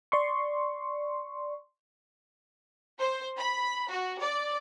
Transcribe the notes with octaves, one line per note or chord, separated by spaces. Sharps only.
D5 C6 C#6
C5
B5
F#4
D5